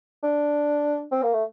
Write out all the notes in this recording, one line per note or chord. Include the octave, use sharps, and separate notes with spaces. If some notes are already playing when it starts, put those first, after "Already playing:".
D4
C4
A#3
A3